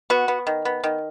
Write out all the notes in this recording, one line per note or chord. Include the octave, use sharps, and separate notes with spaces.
B3 F#4
B3
D#3
B3
D#3